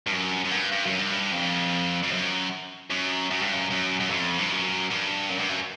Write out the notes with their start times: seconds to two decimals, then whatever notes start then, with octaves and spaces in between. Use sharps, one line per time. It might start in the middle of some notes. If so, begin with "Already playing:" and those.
0.07 G2
0.12 F#2
0.45 F#2
0.52 G2
0.72 G2
0.86 F#2
0.99 G2
1.32 F2
2.03 F2
2.11 F#2
2.91 F#2
3.31 F#2
3.42 G2
3.53 F#2
3.71 F#2
4.00 F#2
4.10 F2
4.39 G2
4.50 F#2
4.90 G2
5.29 F#2
5.39 G2
5.49 F#2